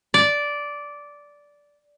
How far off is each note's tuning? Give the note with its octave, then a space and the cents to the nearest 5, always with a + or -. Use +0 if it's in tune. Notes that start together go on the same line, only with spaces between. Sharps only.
D5 -10